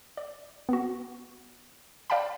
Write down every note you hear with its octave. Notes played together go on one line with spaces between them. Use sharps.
D5
B3 F#4
D5 F5 G5 A5 B5